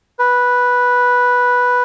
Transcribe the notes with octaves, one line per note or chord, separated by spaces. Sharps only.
B4